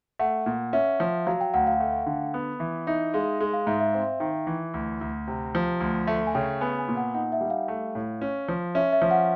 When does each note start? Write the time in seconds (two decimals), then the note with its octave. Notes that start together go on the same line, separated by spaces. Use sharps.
0.19 A3 F#5
0.46 A#2
0.73 C#4 E5
1.00 F3
1.27 F#3 F5
1.41 G5
1.54 D2 F#5
1.67 F5
1.80 A3
2.06 D3
2.34 B3
2.60 E3
2.87 D#4 E5
3.14 G#3 F5
3.40 G#3
3.53 F5
3.67 G#2 E5
3.80 E5
3.94 C4
4.20 D#3
4.47 E3
4.74 D2
5.01 D2
5.27 C3
5.55 F3
5.80 D2
6.07 A3
6.27 G#5
6.35 C#3 G5
6.61 B3 G#5
6.79 G#5
6.88 A#2
6.97 F#5
7.14 D#4 F#5
7.32 E5
7.41 G3
7.50 F5
7.68 A3
7.95 A2
8.21 C#4
8.49 F3
8.75 C#4 E5
8.93 E5
9.02 F3
9.11 F#5